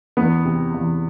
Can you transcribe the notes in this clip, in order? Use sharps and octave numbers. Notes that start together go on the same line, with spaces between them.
E2 B3
C3
E2